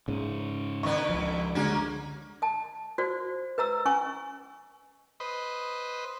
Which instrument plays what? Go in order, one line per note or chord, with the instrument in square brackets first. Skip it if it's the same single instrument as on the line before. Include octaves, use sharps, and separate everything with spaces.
[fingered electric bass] G#2 C#3
[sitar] D3 D#3 B4 [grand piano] C#6
[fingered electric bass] C#2 F3
[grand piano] D3 G#3 [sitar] A#3 C#4 F#4
[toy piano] D#5 A5
F#4 C5 D5
B4 D#5 A#5 E6
C#4 D#5 G#5 C#6
[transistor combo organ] B4 C5 D#5